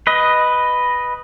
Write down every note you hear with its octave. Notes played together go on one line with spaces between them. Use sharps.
B4 D#5